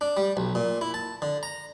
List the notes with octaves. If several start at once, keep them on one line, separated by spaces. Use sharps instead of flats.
D4
G3
B1
A#2
E4
A5
D3
A#5